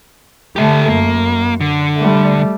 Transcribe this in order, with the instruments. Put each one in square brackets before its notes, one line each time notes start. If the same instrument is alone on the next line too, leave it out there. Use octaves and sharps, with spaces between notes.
[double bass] D3 A3 [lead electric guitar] G4 A4
[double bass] F#2 [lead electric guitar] A#3
[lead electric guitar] D3
[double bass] G3 A3